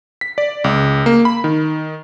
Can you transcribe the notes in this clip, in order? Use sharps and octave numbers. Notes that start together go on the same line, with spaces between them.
B6
D5
C#2
A#3
B5
D#3